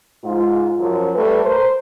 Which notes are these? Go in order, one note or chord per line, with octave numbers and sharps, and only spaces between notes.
G#2 F4
F#2 F3
G3 A3 A4 B4
A#4 C5